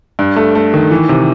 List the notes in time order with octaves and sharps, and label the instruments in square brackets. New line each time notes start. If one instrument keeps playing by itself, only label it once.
[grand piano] G2
A3
A3
D#3
E3
C3